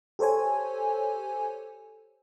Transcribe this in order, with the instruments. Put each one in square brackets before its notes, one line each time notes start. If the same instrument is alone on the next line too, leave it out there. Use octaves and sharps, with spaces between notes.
[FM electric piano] G4 A4 C5 C#5 G#5